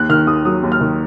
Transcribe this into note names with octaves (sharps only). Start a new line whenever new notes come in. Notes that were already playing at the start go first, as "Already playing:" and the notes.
Already playing: D#2 F#6
D#3 F6
D#2 D#6
F#3 D#6
D#2
F6
D#3